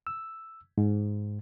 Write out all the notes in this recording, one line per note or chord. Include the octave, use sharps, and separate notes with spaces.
E6
G#2